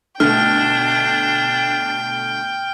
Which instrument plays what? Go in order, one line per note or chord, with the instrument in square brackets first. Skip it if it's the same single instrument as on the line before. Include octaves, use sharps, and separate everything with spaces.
[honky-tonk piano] B2 D3 A3 [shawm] D4 [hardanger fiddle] G5 [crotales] F6